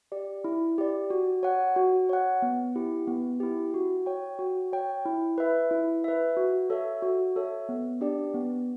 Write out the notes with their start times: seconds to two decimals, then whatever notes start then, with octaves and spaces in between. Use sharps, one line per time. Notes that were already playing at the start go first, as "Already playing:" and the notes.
0.12 G4 D5
0.44 E4
0.78 G4 D5
1.10 F#4
1.43 C#5 F#5
1.76 F#4
2.09 C#5 F#5
2.42 B3
2.76 E4 G4
3.08 B3
3.40 E4 G4
3.74 F#4
4.06 C#5 G5
4.39 F#4
4.73 C#5 G5
5.06 E4
5.38 B4 E5
5.71 E4
6.04 B4 E5
6.37 F#4
6.70 A4 C#5 E5
7.02 F#4
7.36 A4 C#5 E5
7.69 B3
8.01 D4 G4 D5
8.34 B3